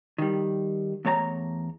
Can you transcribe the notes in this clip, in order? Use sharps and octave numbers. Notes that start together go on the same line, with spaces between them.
D#3 G3
E2 A3 C#5 A5 A#5